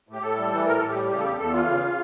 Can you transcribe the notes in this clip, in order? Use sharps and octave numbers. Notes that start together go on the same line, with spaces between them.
A2 G4
A2 A4
G3
E3
A2 A#4
A2 A4
G4
G3
C#3 G4
A4
E2 G4
E2 A4
E3 F4
C#3